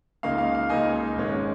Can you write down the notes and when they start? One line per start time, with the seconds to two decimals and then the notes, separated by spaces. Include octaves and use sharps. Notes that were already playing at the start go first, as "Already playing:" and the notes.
0.23 C#2 C#3 A#3 D#4 F5
0.38 F5
0.55 F5
0.70 C#2 C#3 A#3 D#4 D#5 G#5
1.16 G#1 G#2 G#3 C#4